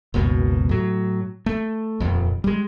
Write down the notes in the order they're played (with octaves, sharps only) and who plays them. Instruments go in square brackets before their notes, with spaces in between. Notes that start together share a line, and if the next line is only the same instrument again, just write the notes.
[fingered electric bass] F#1 C#2 B2
A2 F#3
A3
D#1 F2
G3 G#3